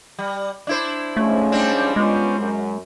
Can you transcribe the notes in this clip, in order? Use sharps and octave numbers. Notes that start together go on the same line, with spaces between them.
G3
D4 E4 C5
G#2 F3 A3 C#4
G3 C4 D4
G#3 B3 C#4 F4
F#2